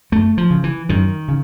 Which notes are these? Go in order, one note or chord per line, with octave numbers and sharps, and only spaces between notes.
F#2 A3
F3
C#3
E3
F#2 D#3
C#3